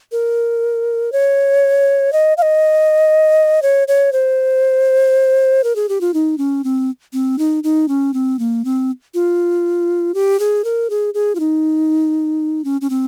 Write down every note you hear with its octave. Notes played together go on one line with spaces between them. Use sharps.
A#4
C#5
D#5
F5
D#5
C#5
C#5
C5
A#4
G#4
G4
F4
D#4
C#4
C4
C4
D#4
D#4
C#4
C4
A#3
C4
F4
G4
G#4
A#4
G#4
G#4
F4
D#4
C#4
C#4
C4